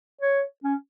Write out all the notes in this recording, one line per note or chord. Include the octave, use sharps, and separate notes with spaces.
C#5
C#4